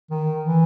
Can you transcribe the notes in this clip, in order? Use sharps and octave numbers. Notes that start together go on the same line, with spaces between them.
D#3
E3